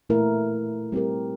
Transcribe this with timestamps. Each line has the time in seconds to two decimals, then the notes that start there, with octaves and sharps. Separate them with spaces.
0.09 A#2 A3 E4 A#4
0.92 G3 C4 G4 A#4